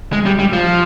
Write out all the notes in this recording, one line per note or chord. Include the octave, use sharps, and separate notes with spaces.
G#3
G3
G3
F3